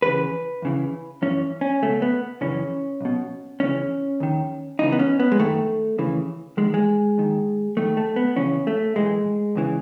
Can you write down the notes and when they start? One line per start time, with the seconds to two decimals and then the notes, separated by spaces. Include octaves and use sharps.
0.02 E2 C#3 E3 B4
0.62 E2 C#3 E3
1.22 F#2 E3 C#4
1.61 C#4
1.82 C#2 B2 A3
2.02 B3
2.41 F#2 C#3 E3 C#4
3.01 B1 B2
3.60 E2 C#3 E3 C#4
4.20 D#2 D#3
4.79 C#2 C#3 E3 D#4
4.92 B3
4.99 C#4
5.20 B3
5.32 G#3
5.39 F#2 D#3 A3
5.98 D#2 C#3 E3
6.57 E2 D#3 G#3
6.74 G#3
7.18 D#2 D#3
7.77 D#2 D#3 A3
7.97 A3
8.16 B3
8.36 E2 C#3 E3 C#4
8.67 A3
8.96 B1 A2 E3 G#3
9.55 E2 C#3 E3